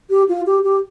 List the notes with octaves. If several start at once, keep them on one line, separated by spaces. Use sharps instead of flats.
G4
F4
G4
G4